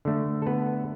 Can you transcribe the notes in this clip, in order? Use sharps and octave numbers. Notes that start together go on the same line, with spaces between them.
D3 A3
A4
B3 B4